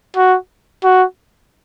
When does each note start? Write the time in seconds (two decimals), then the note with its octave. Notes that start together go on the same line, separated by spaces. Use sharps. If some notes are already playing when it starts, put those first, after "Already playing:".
0.17 F#4
0.84 F#4